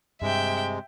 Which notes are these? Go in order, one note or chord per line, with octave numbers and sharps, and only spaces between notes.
G2 C3 G#3 E5 G5